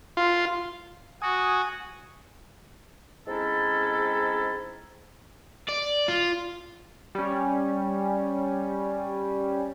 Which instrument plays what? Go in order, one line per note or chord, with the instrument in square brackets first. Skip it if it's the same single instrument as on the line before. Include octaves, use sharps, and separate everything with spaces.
[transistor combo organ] F4
[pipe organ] F#4 [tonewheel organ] G#5 D#6
[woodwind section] G#3 C4 C#4 D#4 E4 A4
[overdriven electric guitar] D5
F4
[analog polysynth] G3 C#4